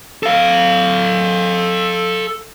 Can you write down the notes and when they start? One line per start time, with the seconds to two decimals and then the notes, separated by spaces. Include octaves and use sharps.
0.23 A4 F5